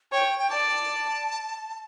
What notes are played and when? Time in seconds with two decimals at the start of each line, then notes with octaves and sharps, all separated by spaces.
0.12 C#5 G5
0.39 G5
0.50 D5 A5